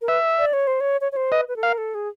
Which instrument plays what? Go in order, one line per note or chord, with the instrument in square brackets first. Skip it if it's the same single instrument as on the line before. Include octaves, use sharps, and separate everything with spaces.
[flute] A#4
[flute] B4 [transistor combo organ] E5
[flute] D5
C#5
C5
C#5
C#5
C#5
C5
[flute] B4 [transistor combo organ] D#5
[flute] B4
A4
[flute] A#4 [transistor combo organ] F5
[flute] A4
G#4